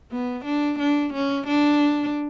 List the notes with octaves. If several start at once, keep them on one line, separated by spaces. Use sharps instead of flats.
B3
D4
D4
C#4
D4